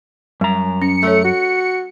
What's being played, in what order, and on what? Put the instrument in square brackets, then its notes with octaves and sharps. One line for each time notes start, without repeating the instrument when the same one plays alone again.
[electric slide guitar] F#2 A#5 [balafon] G3
[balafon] C#4 [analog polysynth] C#7
[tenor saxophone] A3 [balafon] A4 C#5
[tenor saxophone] F#4